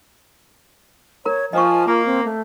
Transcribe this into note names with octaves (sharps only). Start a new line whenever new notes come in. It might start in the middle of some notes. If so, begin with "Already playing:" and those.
A#4 C#5 A#5
F3 D#5 G#5 C#6
A#3 F4
C4
A3